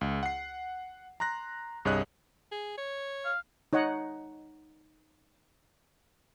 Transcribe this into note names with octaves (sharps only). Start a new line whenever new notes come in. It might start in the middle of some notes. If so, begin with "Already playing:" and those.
C#2
F#5 C7
A#5 C6 F#6 A#6
C2 G2 G#4 C#5 D#5 F#6
G#4
C#5
F5
D#4 C#5 D#5 F#5